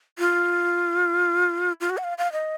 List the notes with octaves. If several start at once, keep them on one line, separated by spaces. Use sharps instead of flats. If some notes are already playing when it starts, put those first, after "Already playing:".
F4
F4
F#4
F#5
F5
F5
D#5